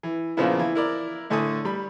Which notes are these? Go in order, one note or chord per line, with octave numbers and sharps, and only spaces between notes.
E3
A#2 C#3 F3 A#3 B3 E4
E3
E4 A#4 D5
A2 D3 A3 G#5 D6 D#6
G3 B5